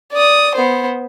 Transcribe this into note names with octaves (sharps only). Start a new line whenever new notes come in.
D5 D#6
B3 C5